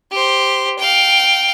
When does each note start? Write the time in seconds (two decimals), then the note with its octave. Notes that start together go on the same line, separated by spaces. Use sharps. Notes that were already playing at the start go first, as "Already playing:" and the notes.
0.12 G4 C5
0.78 F5 G5